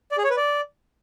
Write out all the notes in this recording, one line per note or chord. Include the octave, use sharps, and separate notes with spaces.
D5
G#4
C#5
B4
D5